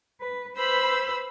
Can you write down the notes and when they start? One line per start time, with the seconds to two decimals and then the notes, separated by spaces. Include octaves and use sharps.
0.20 B4
0.56 B4 C5 B5 E6